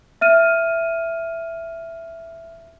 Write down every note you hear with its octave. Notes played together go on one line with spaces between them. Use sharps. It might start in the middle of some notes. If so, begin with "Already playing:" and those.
E5 F6 D#7